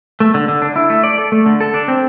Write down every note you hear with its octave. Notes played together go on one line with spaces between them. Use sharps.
A3
D3
D3
D4
E4
A3
D5
A4
A3
D3
A4
D4
C4